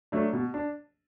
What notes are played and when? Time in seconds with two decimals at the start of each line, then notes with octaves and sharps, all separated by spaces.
0.12 F#3 A3 D4
0.33 B2
0.54 D4